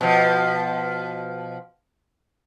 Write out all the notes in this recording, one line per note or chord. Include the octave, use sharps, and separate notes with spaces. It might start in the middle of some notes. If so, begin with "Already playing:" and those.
B2 F3